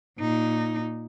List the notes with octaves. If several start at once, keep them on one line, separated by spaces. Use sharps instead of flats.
A#2 D#4